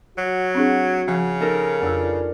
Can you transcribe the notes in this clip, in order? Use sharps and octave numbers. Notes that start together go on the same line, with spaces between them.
F#3 F#4
C4 D4 G#4
C#3 F3
D#4 A4 A#4
F2 D4 F4 G4 B4 E6